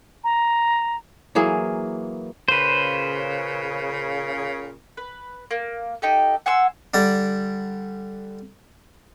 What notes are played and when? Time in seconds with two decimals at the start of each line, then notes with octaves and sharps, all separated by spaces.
0.24 A#5
1.35 E3 F#3 A#3 G#4
2.48 A#2 C#3 B4 C5
4.97 B4
5.51 A#3
6.02 D#4 G4 A4
6.46 F#5 G#5 C6 E6
6.94 D3 G3 D5